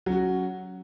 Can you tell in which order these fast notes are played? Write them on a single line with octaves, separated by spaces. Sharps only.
F#3 C#4 F#4